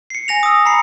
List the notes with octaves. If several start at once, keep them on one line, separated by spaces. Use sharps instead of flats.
C7 C#7
G#5 A#6 F7
D#6 E6
A#5 B5 C7 C#7